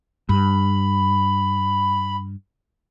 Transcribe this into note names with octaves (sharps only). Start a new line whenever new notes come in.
G2 B5